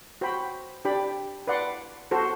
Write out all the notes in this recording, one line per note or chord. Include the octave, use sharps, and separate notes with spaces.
F#4 C5 G5 B5
D4 G4 D5 G5 B5
B4 D5 F#5 C6
F#4 A4 C5